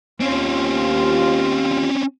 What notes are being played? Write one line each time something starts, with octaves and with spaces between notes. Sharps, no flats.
D#2 C4 C#4 F4